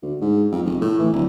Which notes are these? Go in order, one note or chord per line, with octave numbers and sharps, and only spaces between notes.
D2
G#2
F2
F1
A2
E3
D1